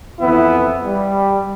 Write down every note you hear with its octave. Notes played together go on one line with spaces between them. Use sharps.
F2 E3 B3 E4
G3